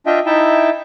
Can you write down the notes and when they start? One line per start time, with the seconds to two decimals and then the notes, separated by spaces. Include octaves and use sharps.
0.06 D4 F4 D#5 E5 G5
0.26 D#4 E4 E5 G5 A5